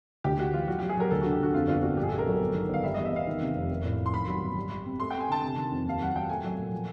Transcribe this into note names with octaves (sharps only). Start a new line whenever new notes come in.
D2 G4
D2 F#4
E3 F4
F#3 F#4
F#3 G4
G#4
F#3 A#4
D2 A4
D3 F#4
G4
D3 F#4
F2 F4
G1 F4
G1 F#4
A#1 G4
G#4
A3 A4
A#4
F#3
G1
D#3
G1 F5
G3 E5
E2 D#5
E5
E2 F5
D#3
C3
F1
A#3
A2
F3
C6
D#3 B5
F#3
G1
G3
G3
C4
A3 C6
A3 G5
G#5
D3 A5
C3
D#3
F2
D#2 F5
F#3 F#5
F#3 G5
A3 G#5
F#3
A#2
F3